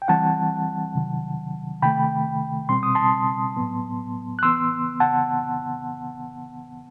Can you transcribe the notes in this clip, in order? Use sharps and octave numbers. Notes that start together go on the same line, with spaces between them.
G5
E3 G3 C4 F#5 A5
C3 D#3 F#3
C3 D#3 A3 G5 B5
B2 G3 C4 C6
D#6
A5 C6
A2 F#3 B3
F#6
E3 B3 C6 E6
F#5 A5